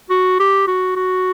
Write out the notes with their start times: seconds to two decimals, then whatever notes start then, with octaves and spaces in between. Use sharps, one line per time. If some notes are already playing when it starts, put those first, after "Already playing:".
0.10 F#4
0.40 G4
0.67 F#4
0.96 F#4